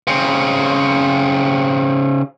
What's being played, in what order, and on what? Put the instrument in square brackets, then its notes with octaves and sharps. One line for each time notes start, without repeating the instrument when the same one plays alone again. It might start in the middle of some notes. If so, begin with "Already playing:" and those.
[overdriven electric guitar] C#3 C4